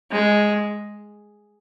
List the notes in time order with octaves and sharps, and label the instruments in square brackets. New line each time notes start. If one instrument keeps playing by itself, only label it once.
[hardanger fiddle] G#3